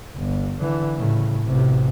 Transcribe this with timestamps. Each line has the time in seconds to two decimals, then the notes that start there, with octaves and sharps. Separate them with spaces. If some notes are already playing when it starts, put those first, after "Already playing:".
0.16 G1
0.61 D3 E3
0.97 A2 C#3
1.45 A1 C3